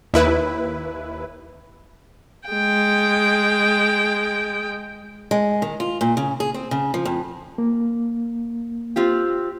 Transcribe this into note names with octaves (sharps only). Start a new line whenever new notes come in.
D#2 E4 B4
G#3 G5
G#3
D#3
F4
A#2
C#3
G#4
C4
C#3
F3
F2
A#3
C4 F4 G4